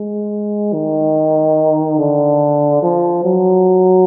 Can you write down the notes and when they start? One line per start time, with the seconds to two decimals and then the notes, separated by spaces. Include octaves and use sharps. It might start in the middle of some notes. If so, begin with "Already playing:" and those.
Already playing: G#3
0.73 D#3
1.99 D3
2.83 F3
3.25 F#3